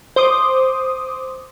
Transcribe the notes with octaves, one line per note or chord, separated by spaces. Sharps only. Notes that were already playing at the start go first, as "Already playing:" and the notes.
C5 C6 D6 D#6